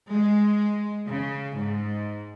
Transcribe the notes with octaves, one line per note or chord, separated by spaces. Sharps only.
G#3
C#3
G#2